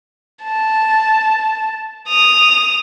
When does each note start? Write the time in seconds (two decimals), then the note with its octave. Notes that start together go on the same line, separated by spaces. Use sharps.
0.44 A5
2.08 D#6 F7